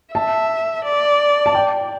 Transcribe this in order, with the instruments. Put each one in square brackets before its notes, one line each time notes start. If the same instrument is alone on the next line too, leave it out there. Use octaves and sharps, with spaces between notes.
[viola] E5 [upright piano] A5
[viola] D5
[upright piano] A5
G5